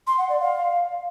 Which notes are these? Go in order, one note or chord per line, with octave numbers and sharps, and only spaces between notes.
C6
F#5
D5
F5